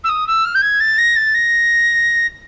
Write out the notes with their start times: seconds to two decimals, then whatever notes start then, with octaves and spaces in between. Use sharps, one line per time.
0.03 E6
0.09 D#6
0.27 E6
0.44 F6
0.54 G6
0.61 G#6
0.80 A6
0.98 A#6
1.16 A6
1.34 A#6